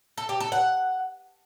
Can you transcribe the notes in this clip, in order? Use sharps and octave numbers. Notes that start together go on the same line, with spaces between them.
A4
G4
A4
F#5